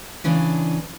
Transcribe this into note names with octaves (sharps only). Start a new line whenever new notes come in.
C#3 E3 D4